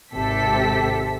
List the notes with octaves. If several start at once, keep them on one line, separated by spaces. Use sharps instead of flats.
G#1 C3 G4 A4 B6